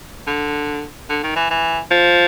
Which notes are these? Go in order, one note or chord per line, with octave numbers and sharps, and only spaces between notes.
D3
D3
D#3
E3
E3
F3